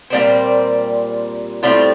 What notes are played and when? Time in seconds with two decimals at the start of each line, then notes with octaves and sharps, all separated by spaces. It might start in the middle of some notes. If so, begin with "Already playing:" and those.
0.10 A#2 G3 C4
1.63 A2 G3 C4 F4